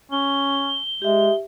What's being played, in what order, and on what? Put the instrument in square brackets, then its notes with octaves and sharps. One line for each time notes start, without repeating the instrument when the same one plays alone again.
[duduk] C#4 [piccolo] G7
[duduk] G#3 [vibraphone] G4 E5